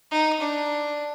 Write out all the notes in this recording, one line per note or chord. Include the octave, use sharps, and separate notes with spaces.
D#4
D4